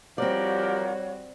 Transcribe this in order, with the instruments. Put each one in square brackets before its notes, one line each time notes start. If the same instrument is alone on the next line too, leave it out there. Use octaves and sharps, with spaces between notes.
[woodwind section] F3 G4 A#4 [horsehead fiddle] G3 F#4 [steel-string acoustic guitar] C4 D5 [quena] C#5